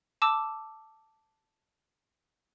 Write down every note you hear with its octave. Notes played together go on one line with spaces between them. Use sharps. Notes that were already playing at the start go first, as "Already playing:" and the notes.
A5 D6 E6 E7